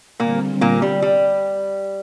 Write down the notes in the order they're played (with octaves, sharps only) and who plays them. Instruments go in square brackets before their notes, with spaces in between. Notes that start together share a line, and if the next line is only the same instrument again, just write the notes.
[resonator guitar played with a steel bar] A#2 A#3 [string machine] D3 G3 C4
[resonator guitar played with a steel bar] A#2 A#3
G3
G3